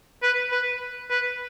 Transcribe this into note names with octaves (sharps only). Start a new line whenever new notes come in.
B4
B4
B4